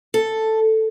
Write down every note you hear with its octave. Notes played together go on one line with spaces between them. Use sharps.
A4